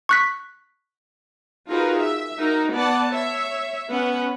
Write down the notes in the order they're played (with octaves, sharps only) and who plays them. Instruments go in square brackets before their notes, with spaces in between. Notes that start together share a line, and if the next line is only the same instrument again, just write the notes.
[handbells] C#6 F#6 B6
[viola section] D#4 F4 F#4 G#4 A#4 B4
E5
D#4 F#4 A#4
B3 D5 F#5 A5
C#5 E5
B3 C#4 B4 F#5